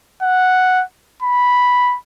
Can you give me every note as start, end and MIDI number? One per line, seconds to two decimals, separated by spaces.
0.23 0.83 78
1.23 1.97 83